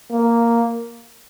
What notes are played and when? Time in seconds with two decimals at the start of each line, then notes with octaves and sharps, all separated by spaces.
0.12 A#3